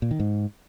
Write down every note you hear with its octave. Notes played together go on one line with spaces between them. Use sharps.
A#2
D#3
G#2